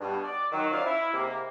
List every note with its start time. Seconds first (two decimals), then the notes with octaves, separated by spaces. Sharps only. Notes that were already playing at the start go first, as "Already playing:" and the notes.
0.01 G2 B2
0.24 D5
0.52 D#3 F#3
0.72 C#4 F4 C5 D5 F5
0.86 E4
1.14 G#2 C3 A#3